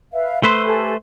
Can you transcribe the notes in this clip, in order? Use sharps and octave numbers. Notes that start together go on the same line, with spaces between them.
B4 E5 F5
A3 B4 C5 B5 C6 E6
G4 A4 G#5